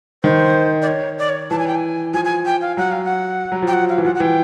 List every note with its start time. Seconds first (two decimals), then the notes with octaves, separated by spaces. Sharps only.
0.24 D#3 C5
0.82 D5
0.87 C#5
1.18 D5
1.29 C#5
1.51 E3 A5
1.59 G#5
1.67 G5
1.75 G#5
2.14 F3 G#5
2.25 G#5
2.46 G5
2.61 F5
2.77 F#3 F#5
2.91 F5
3.05 F#5
3.52 F#3
3.62 F3 G5
3.73 F#5
3.89 F5
3.98 E3
4.05 F3 F#5
4.15 F#5
4.20 E3 G5